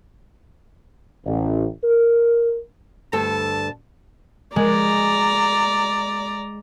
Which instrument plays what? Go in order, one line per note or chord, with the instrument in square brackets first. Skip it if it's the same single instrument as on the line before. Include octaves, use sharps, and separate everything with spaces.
[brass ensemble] A1
A#4
[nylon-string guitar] D2 G2 A4 [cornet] A5
[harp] G#3 [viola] D5 A#5